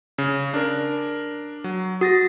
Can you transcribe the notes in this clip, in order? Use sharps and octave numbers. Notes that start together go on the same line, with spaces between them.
C#3
D4 A#4
F#3
F#4 D#6 A6 A#6